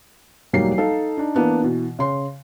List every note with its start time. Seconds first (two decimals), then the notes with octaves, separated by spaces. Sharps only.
0.53 E1 F#3 G3 A#3 D#4 C7
0.78 D#4 A4 F5
1.18 D4 D#4
1.35 E3 A#3 B3 D4
1.62 B2 E3
1.99 C#3 C6